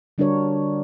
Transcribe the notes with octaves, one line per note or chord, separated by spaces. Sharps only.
D3 G3 D4 F#4 A#4 C#5